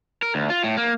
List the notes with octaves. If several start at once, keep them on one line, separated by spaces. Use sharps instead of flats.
A#4
D2
F4
A2
A#3